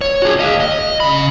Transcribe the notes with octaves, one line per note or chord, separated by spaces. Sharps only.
C#5
F#4 G#4
D#5 F5
D#5
C#3 B5